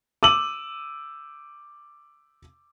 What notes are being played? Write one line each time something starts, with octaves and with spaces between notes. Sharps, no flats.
D6 E6 D#7 F#7